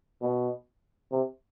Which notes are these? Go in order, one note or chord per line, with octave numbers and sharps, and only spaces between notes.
B2
C3